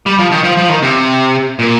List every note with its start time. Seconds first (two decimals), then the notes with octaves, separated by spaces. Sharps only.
0.06 G3
0.18 F3
0.31 D#3
0.44 F3
0.57 F3
0.69 D#3
0.82 C3
1.59 A#2